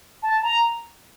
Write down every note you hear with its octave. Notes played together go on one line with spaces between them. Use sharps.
A5
A#5